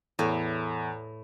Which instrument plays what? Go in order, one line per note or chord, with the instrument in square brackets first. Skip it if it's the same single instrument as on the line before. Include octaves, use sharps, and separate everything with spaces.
[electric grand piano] E2 [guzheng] A2